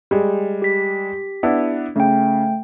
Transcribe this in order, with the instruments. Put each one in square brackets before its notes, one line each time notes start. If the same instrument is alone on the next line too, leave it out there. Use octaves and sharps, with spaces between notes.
[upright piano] G3 G#3
[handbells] G4 B6
[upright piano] B3 D4 E4
[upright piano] C#3 [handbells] A3 G5